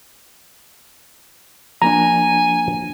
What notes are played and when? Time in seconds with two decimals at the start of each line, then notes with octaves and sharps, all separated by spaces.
1.82 F3 A#3 D4 G#5 A#5